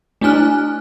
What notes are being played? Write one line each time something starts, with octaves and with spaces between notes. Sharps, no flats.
A3 D4 E4 G#5 F6 F#6